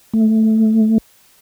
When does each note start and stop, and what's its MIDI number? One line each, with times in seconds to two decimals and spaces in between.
0.14 0.98 57